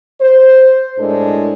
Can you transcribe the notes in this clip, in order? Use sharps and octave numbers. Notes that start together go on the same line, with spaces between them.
C5
A2 G#3 D4 A4 A#4